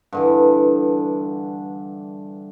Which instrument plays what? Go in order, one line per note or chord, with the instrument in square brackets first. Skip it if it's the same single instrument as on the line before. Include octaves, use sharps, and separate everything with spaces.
[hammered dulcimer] G2 D3 E3